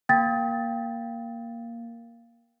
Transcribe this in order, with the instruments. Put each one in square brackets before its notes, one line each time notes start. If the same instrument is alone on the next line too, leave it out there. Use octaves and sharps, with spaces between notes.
[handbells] A#3 [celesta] G5 A6